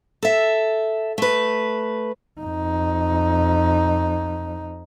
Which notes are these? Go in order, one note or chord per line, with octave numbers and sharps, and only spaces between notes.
A4 E5
A3 B4
F2 D#4